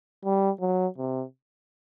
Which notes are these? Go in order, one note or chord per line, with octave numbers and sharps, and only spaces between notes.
G3
F#3
C3